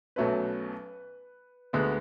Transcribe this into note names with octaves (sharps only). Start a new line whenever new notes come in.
B1 B2 F#3 A3 C#4 B4
D2 D3 G#3 B3